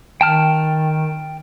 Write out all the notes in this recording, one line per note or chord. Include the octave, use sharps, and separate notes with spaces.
D#3 G5 A5 F6